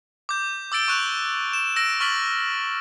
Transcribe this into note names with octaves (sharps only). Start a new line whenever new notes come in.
D6 G6
D6 E6 A6 D7 G7
C#6 F#6 F7
E7
E6 A#6 D7
C#6 F6 A6 B6 F#7